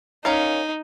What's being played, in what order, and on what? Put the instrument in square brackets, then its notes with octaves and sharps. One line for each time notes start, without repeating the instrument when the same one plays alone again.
[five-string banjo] C#4 A#4 F5 [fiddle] D#4